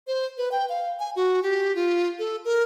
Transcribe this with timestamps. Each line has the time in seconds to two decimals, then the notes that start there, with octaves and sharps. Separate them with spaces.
0.07 C5
0.38 B4
0.52 G5
0.69 F5
0.99 G#5
1.16 F#4
1.43 G4
1.75 F4
2.19 A4
2.45 A#4